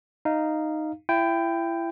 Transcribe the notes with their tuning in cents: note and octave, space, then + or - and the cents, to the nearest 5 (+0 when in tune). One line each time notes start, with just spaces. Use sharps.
D#4 -5 F5 -10
E4 +30 G5 +0